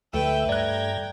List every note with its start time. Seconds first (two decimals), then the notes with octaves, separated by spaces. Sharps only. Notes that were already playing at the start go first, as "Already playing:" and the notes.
0.13 D2 A3 D4 G4 B4 E5 G5
0.49 G2 D5 G5 A#5 F#6 G#6